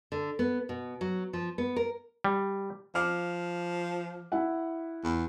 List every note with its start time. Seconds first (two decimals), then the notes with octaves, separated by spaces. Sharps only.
0.12 D3
0.39 B3
0.69 B2
1.01 F#3
1.33 F3
1.58 B3
1.76 A#4
2.24 G3
2.95 F3 F5 D6 F6
4.32 E4 E5 F#5
5.04 E2